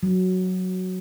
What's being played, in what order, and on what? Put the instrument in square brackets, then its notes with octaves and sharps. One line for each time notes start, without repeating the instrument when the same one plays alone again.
[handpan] F#3